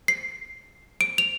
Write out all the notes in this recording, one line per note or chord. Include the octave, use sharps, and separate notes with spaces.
C7
D7
F7